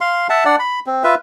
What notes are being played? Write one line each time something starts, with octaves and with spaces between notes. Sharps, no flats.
F5 C6
E5 F#5 A5
D4 D5 F#5
B5
C4
F4 B4 E5